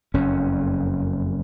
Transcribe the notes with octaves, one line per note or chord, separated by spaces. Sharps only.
F#1 F2 C#4